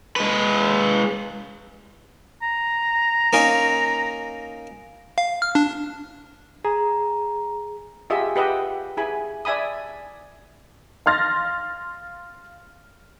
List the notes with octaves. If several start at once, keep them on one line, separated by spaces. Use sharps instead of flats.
G#3 B4
A#5
A#3 C#4 D#4
F5
F6
D4
G#4 A#5
F4 G4 G#4 D#5 E5
G4 B4 D#5 E5 F#5
E4 G#4 G#5 B5
D5 E5 G#5 B5 D#6
F5 C6 F6 A6 A#6